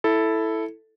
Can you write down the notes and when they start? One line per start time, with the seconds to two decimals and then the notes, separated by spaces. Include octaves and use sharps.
0.04 E4 A4